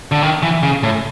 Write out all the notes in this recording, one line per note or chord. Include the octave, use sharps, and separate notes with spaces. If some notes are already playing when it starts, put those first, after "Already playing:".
D3
D#3
E3
C#3
A2